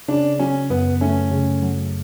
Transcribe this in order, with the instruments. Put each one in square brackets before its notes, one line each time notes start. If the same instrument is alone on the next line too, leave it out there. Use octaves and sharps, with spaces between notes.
[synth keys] C#3 [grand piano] D4
[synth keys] F#3 [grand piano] C#4
[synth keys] F#2 [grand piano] B3
[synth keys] A3 [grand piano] C#4
[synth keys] C#3
F#3